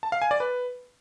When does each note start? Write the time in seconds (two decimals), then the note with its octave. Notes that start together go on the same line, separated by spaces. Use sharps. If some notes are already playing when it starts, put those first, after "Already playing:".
0.03 A5
0.12 F5
0.22 G#5
0.31 D5
0.40 B4